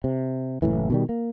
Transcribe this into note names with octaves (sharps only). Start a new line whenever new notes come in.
C3
F#1 C#2 A2 E3
B2 D#3 G3
A#3